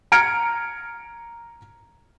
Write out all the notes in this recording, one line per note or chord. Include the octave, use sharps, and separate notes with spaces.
A#5 F6 G#6 C#7 D7